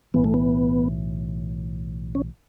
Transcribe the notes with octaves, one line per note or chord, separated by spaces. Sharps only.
B1 A2 E3 B3
A3
B3
C#4